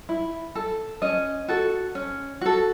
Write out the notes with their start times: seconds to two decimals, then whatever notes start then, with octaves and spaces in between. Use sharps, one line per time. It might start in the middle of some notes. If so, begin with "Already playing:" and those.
0.09 E4
0.55 A4
1.02 C#4 D#5
1.48 F#4 A4
1.95 C#4
2.41 F#4 A4